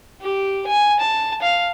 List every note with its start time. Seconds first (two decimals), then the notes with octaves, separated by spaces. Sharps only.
0.22 G4
0.67 G#5
1.00 A5
1.42 F5